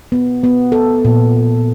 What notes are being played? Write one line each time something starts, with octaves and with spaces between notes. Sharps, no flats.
B3
B3
A4
A#2